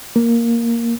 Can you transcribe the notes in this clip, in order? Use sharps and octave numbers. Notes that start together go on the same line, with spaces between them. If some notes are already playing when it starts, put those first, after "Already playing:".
A#3